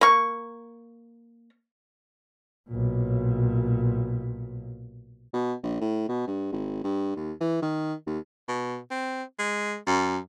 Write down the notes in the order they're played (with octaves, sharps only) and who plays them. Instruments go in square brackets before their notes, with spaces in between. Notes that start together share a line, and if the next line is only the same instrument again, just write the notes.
[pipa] A#3 C#6
[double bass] B1 A#2
[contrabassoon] B2
A#1
A2
B2
G2
G#1
G2
D#2
E3
D#3
D#2
[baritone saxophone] B2
C4
G#3
F#2